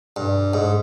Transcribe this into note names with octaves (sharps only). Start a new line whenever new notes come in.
G2
G#2